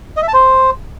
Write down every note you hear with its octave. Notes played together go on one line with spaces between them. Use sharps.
D#5
E5
A5
C5